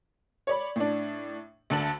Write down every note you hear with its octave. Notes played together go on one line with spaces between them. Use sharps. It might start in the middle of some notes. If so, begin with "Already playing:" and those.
C#5 D5 B5
A2 D4
D2 D3 A5 F#7